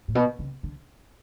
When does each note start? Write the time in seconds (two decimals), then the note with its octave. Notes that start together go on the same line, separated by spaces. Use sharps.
0.08 A2
0.15 B2
0.39 C#3
0.63 D3